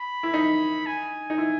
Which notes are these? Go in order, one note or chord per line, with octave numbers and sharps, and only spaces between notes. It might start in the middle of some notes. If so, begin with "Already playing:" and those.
Already playing: B5
E4
D#4
G#5
D#4
E4